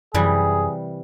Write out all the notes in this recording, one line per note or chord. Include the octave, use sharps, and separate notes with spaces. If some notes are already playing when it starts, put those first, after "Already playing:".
F#2 C3 E3 G3 G#4